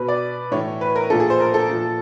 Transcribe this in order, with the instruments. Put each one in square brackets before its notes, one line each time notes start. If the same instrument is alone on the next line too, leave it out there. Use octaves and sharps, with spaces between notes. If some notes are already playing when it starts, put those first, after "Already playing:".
Already playing: [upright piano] B2 B4
D5
A2 E3 C#5
B4
A#4
A#2 F3 A4
G#4
C5
A#4
A4
A#2 F3